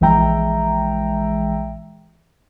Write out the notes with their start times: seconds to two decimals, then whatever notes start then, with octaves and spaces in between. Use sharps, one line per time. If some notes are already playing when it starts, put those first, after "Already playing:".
0.01 A#1 E3 G#3 E5 G5 A#5